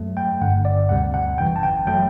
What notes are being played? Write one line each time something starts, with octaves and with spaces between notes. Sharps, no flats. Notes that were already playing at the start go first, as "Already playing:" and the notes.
Already playing: F#2 F#3 A3
G5
G1 G2 D3 F#5
D5
D2 C3 G3 F#5
F#5
G1 F#2 E3 G5
A5
G5
F#3 A3 G5